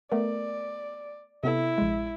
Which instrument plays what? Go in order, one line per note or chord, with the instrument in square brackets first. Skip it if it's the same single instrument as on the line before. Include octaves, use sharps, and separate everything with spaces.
[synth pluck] A3 B3 A#4 [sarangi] D5
[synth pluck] C3 B3 A4 [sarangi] E4
[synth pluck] A#1 G#3